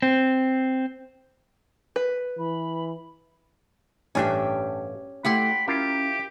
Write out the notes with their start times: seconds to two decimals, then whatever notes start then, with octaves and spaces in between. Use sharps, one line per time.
0.02 C4
1.96 B4
2.38 E3 B5
4.15 A1 G2 C#4 D4 G4 E5
5.25 A3 E4 G4 F#5 G5 B5 C6
5.68 C#4 E4 F4 G4 A#4